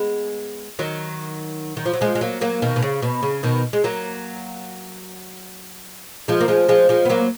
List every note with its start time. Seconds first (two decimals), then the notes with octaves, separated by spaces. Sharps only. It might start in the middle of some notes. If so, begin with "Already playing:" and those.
Already playing: G#3 B3
0.79 D#3 F#3
1.77 D#3
1.85 F3
1.93 F#3
2.01 F3 G#3
2.15 G#3
2.21 F#3 A#3
2.41 F#3 A#3
2.62 B2 D#3
2.76 B2
2.82 C#3
3.02 B2
3.23 C#3
3.43 B2 D#3
3.73 G#3
3.84 F#3 A#3
6.28 F3 G#3
6.41 A#3
6.48 F3 G#3
6.68 F3 G#3
6.89 F3 G#3
7.05 B3
7.10 F#3 A#3